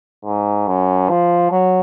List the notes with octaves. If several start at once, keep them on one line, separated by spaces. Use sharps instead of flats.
G#2
F#2
F3
F#3